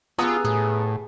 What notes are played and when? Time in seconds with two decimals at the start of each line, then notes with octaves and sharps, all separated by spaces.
0.19 B3 F4 G4 G#4 F#5 A#5 E6
0.45 A2 G#4